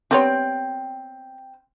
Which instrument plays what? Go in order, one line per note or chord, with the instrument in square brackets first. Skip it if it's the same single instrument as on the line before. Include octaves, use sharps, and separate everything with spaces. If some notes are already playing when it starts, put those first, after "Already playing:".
[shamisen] G3 B3 C#5 [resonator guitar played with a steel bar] C4 G5